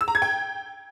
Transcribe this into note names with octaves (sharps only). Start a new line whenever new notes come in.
E6
A#5
G#6
G5